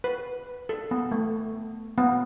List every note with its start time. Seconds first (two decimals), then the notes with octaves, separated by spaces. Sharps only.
0.04 B4
0.69 A4
0.91 B3
1.11 A3
1.98 B3